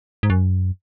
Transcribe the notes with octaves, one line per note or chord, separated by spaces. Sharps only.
G#2
F#2